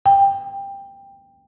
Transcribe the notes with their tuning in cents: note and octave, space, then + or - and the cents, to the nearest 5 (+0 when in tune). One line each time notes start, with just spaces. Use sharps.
G5 +15